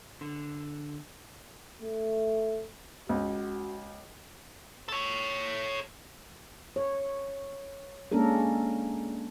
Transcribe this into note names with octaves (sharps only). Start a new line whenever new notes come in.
D3
A3
C#2 F#4
A4 C#5
C#5
G#3 A#3 C#4 D4 A4 A#4